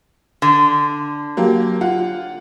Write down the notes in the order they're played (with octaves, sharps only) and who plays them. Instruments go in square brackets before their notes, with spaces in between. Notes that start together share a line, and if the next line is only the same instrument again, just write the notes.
[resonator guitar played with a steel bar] D3
[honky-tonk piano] F#3 A#3 G4
F4 F#5